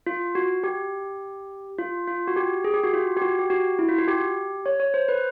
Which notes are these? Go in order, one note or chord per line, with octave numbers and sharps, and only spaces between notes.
F4
F#4
G4
F4
F4
F#4
G4
G#4
G4
F#4
F4
G4
F#4
G4
F#4
E4
F4
F#4
G4
C#5
C#5
C5
B4